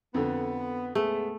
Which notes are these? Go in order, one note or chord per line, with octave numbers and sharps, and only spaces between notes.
F2 D3 B3
A#2 G#3 A3 B3 G#4